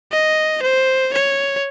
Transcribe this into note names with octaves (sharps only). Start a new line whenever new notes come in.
D#5
C5
C#5